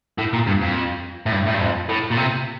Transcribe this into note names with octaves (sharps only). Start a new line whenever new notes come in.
A2
A#2
G2
F2
A2
G2
A2
G2
F2
A2
A#2
C3